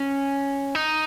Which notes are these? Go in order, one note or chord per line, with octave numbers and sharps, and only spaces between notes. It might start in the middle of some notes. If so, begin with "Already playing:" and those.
Already playing: C#4
D#4